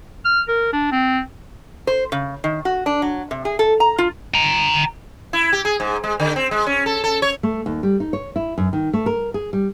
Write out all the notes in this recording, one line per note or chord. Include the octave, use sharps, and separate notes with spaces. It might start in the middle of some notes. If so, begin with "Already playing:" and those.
F6
A#4
D4
C4
C5
C#3
D#3
F#4
D4
F#3
C3
G#4
A4
A#5
F4
G5 A#5
E4
G4
G#4
G#2
G#3
D3
C4
G#3
C#4
A4
A4
C#5
A3
D#2
G3
D#4
C#5
E4
F#2
D#3
A3
A#4
G#4
G3